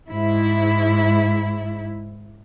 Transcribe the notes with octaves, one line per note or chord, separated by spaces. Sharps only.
G#2 E4